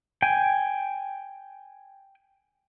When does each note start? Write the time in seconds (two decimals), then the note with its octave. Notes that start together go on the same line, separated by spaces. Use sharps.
0.22 G5 G#5